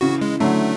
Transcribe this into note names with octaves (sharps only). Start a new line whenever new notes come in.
C#3 E3 F#4
G#3
D3 F#3 A3